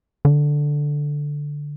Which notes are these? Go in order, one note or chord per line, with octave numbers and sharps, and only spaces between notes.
D3